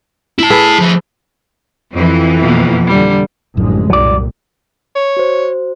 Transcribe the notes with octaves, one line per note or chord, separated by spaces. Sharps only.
E4 A5
G#4 A4 B4
F3 E4
F2 E3 C4
B2 F3 A#3
D3 G3
A1 F#2 D3 F3 G#3
C2 A#2 F#3 D5
C#5
F#4 C5